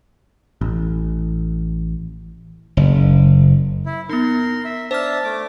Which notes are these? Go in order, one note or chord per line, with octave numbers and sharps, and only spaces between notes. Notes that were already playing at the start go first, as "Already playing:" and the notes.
A1
F#1
E4
B3 D#4 A#4 C6
E5
D4 C5 E5 A5 F6
A3 D6